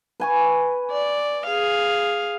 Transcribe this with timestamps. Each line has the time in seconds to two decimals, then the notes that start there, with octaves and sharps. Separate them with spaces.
0.20 B4 G#5 C#6
0.91 D5
1.46 G#4 F5